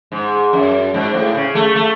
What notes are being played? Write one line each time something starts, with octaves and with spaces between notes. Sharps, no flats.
G#2
F#2
G#2
A2
C#3
A3
A3